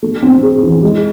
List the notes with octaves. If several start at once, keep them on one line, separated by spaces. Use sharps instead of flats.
A3
C4
G#4
E3
G#3